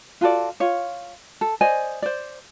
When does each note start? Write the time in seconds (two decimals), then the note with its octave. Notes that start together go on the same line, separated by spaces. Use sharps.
0.21 F4 F#4 A4 D5
0.60 F4 C#5
1.41 A4
1.61 C5 D5 D#5 G#5
2.02 C5 D5